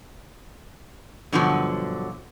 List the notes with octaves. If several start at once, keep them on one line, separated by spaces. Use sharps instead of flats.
G2 B2 D3 F3 F#3